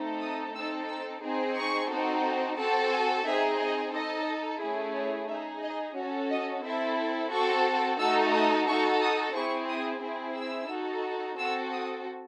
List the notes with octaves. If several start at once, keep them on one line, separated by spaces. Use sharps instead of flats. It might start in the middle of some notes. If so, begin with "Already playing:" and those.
Already playing: A3 C4 D#4 A4
D#6
C4 D#4 A4 E6
E6
C4 D#4 G#4
C#6
C4 D#4 F#4 A4
C4 F#4 A4 A5
G#5
C4 D#4 G#4 E5
D#5
D#4 A4 D#5
A3 C#4 E4 G#4
C#5
D#4 G#4 E5
D#5
C#4 F#4 A4 C#5
D#5
C4 E4 A4 E5
C4 F#4 A4 C#6
A3 D#4 F#4 A4 E6
D#6
D#4 F#4 A4 C#6
D#6
C4 E4 G#4 C#6
D#6
C4 E4 G#4
E6
D#4 F#4 A4
C4 F#4 A4 E6
D#6